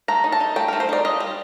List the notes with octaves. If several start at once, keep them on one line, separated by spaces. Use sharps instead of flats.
A3 A#5
D#4
A5
D#4
A3 G5
A3 A#4
C5
D#4 D5
F4 D#5
G3